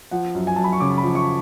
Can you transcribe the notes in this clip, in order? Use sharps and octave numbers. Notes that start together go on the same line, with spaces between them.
F3 F#5
F#2
G#5
F#2 A5
B5
C#6
C#3 D6
B5
F3
C#6